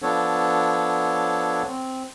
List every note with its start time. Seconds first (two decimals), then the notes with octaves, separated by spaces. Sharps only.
0.02 F3 B3 D4 A4 C#5
1.67 C4